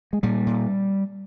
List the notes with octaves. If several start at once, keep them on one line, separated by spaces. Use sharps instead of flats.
G#3
A#2 G3
A#2